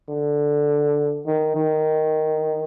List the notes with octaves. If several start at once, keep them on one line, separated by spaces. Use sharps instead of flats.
D3
D#3
D#3